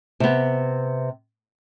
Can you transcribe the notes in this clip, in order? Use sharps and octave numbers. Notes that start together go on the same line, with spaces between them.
C3 B3